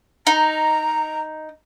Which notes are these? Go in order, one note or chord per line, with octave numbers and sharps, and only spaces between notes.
D#4 A#5